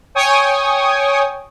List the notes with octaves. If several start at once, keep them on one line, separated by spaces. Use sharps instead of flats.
C#5 G5 G#5 C#6 D#6